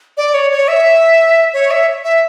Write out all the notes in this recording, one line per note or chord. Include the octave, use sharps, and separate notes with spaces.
D5
C#5
C#5
E5
C#5
E5
E5